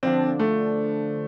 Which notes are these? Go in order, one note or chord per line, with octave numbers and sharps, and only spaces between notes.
D3 F3 C4 D4
A3